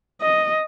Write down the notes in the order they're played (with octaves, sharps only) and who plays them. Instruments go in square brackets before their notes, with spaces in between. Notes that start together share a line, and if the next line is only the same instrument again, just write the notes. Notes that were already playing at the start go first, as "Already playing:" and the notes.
[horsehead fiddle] D#5